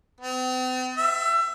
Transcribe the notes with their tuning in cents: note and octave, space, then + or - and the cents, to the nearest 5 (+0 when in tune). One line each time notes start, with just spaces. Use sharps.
C4 -45
E5 +30